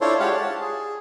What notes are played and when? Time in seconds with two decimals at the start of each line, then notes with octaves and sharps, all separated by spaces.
0.01 D4 E4 F4 A4 C5 C#5
0.20 G#3 F4 G4 C#5 F5 F#5
0.31 A5
0.61 G#4